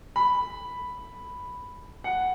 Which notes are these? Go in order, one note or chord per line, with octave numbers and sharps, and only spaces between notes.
B5
F#5